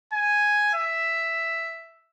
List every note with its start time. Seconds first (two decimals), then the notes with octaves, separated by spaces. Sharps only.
0.13 G#5
0.74 E5